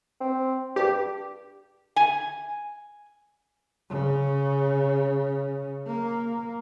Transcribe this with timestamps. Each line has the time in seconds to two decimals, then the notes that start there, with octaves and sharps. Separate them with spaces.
0.21 C4
0.76 G2 G4
1.96 G#5
3.90 C#3
5.87 A#3